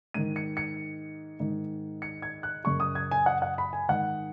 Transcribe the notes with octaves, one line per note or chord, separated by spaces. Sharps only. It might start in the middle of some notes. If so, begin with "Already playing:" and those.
G#2 D#3 D#7
C#7
C#7
G#2 D#3
C#7
G#6
F#6
F#2 C#3 C#6
D#6
G#6
G#5
F#5
F#5
B5
G#5
G#2 D#3 F#5